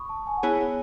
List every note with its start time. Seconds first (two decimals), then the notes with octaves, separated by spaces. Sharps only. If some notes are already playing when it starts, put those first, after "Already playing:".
Already playing: B5 C#6 D#6
0.09 A5
0.27 G#5
0.37 F#5
0.43 B3 E4 G#4 C#5 G#5